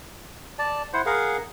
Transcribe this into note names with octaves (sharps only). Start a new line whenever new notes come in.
D5 A5
E4 C5 F#5
G#4 A#4 F5 F#5